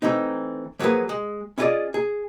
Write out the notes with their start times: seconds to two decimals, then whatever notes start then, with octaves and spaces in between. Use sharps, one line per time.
0.02 E3 A3 C4 D#4
0.79 F3 F#3 A#3 F4 G#4 B4
1.09 G#3
1.58 C#4 E4 F4 G#4 D5 D#5
1.94 G#4